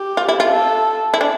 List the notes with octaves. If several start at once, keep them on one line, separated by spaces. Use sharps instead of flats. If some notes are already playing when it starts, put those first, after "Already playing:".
Already playing: G4
F4
E4
F4
A4
E4
D4